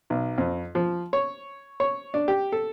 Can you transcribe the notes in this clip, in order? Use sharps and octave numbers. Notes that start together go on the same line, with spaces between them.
B1
F2
F3
C#5
C#5
D4
G4
A4